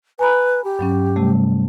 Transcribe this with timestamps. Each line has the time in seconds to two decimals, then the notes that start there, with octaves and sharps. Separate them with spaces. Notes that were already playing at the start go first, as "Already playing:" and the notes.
0.19 B4 G#5 A#5 B5
0.64 G4
0.79 G2 F#3 C#4
1.16 C3 G3 A3